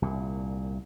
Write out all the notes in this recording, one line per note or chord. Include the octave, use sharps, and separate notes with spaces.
C2 A#2